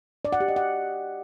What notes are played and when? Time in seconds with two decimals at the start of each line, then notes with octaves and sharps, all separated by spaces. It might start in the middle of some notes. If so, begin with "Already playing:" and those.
0.25 D5
0.33 F#5
0.40 G4
0.48 D#5
0.56 F#5